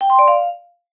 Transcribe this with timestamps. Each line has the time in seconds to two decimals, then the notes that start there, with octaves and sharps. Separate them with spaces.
0.01 G5
0.10 C6
0.19 D5
0.28 F5